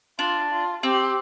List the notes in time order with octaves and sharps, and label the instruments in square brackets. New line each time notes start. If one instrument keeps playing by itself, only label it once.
[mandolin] D4 [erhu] F4
[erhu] F4
[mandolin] C4 [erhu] G4